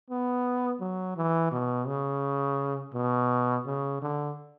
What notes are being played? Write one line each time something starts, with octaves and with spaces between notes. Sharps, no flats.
B3
F#3
E3
B2
C#3
B2
C#3
D3